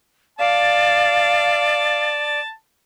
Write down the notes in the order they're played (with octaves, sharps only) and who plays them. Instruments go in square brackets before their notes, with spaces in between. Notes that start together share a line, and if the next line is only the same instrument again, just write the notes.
[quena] D5 [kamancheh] F5 [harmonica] A5